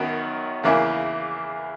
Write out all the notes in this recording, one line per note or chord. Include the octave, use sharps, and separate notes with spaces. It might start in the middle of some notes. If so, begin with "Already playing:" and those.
Already playing: F#2 D#3 F#3 B3 D#4
E2 C#3 E3 A#3 E4